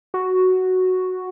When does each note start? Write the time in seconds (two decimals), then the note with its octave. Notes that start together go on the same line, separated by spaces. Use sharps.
0.14 F#4